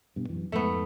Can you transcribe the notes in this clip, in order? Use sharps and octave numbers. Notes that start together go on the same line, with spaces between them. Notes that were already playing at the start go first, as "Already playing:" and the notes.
G2 B2
F#2 E3
F2 G#2 A3 B3